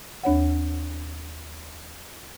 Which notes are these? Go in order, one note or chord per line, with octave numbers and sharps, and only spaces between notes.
D#2 D4 C#5 F#5